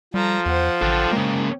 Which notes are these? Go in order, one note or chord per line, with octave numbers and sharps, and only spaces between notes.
F3 G3 A4 A#5
E2 C5 F#5
A1 A4 F#5 G5
C#3 G#3 A#3